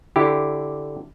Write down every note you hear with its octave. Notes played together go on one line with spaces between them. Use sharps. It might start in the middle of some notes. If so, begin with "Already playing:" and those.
D3 E4 G4